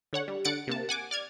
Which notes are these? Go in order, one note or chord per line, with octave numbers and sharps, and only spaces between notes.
D3 C#5 F#5
G3
D3 F#5 A6 C#7 D7
C3 A#3 A5
F#5 G#5 D6
D5 F6 G#6